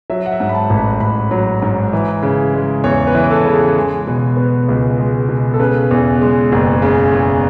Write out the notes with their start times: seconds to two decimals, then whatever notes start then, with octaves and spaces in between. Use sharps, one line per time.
0.10 F#3 E5
0.26 F#5
0.32 E5
0.40 G#2
0.49 B5
0.55 A5
0.70 A1
0.77 B5
1.00 A1 B5
1.31 F#3
1.62 G#2
1.93 E3
2.23 C#3
2.54 G#3
2.84 E2 C#5
3.07 B4
3.15 E3
3.31 A4
3.45 C#3
3.54 G#4
3.76 G#3
4.07 B2
4.37 B3
4.68 C#2
4.99 G#3
5.29 B2
5.54 A4
5.60 C#3 B4
5.91 E2
6.21 G#3
6.52 F#1
6.82 C#3
7.12 E2